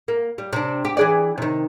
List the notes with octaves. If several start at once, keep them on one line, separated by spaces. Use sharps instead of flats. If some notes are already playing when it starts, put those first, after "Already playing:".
A#3
G3
C3 D4
G4
E3 G#4 D5
C3 D#3